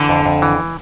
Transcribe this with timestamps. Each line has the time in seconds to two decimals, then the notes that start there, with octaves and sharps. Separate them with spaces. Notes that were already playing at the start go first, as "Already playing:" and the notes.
Already playing: D3 E3
0.09 F2
0.26 F2
0.42 E3